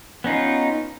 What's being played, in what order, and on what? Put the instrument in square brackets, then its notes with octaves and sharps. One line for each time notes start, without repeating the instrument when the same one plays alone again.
[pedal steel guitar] B3 C#4 D#4 F4